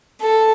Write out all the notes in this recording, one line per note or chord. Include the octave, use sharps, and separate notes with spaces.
A4